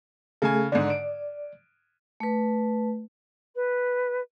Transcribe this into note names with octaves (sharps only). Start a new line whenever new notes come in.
C#3 A3 G#4 A4 G#5
G#2 D3 D5
D7
A3 B4
B4